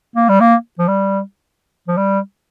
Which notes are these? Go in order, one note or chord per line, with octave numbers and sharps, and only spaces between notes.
A#3
G3
A#3
F3
G3
F3
G3